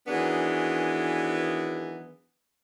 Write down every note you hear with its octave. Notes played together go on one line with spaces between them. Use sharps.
D#3 E3 F#3 B3 D4 G#4